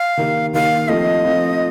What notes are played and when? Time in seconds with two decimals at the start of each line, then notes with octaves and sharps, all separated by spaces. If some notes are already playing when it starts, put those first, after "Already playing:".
Already playing: F5
0.17 D#3 A#3 D#4 G4
0.53 D#3 A#3 D#4 G4 F5
0.88 F3 A3 C4 F4 D#5
1.24 F3 A3 C4 F4